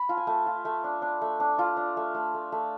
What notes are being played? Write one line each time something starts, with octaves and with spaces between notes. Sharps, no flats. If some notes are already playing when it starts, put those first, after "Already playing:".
Already playing: B5
F4 A5
G#5
A3 A5
F4
A3
D4
D4
A3
D4
F4 A5
D4
A3
A3
A3
A3